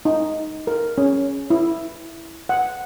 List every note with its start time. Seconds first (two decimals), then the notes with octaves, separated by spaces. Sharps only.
0.05 D#4
0.67 A#4
0.98 C#4
1.50 E4
2.49 F#5